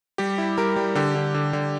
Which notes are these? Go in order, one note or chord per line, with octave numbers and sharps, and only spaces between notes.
G3 G4
E4
G3 A#4
G3
D3 G4
D3
D3
D3